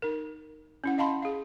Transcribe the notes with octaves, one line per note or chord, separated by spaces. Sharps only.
D#4 A#4
C#4 E4 F#5
D#5 F5 A5 B5 C6
G#4 F5